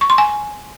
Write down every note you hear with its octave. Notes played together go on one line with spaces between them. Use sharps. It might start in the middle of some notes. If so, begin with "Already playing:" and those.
C#6
C6
G#5